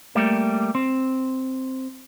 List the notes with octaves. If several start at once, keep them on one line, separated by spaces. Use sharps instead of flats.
G3 A3 A#3
C4